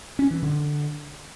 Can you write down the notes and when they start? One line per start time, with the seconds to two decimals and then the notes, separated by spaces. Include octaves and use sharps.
0.19 C#4
0.31 E3
0.42 D3